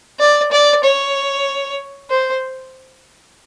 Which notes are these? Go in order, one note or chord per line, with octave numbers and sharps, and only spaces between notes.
D5
D5
C#5
C5